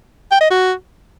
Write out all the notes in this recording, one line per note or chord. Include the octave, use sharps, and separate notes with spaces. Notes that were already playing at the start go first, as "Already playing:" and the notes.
G5
D#5
F#4